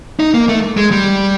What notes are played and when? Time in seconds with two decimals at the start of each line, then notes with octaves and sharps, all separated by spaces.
0.20 D#4
0.34 A#3
0.48 A3
0.77 G#3
0.91 G3